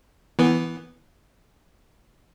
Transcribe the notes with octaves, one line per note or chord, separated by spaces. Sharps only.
E3 B3